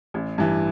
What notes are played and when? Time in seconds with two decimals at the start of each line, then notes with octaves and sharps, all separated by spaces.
0.14 A1
0.38 G2 E3